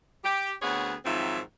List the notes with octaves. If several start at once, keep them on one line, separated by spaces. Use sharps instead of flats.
G4
D2 B3 C4 G#4 C#5 F#5
G#2 D#3 F3 F#3 C4 E5